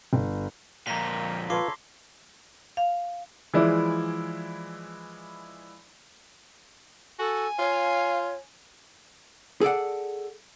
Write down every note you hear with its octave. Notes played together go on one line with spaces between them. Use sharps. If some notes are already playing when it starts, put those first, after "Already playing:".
G1
F2 A#2 A#3 G5 A#5 A#6 B6
F4 A4 B4 C#5 F5 C6 D6 C7
F5
E3 F3 G#3 E4 D5
F#4 A4 G#5
F4 C#5 F5
G#4 A4 D5 F#5